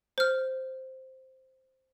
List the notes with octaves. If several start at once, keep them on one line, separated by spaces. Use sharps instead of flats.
C5 F6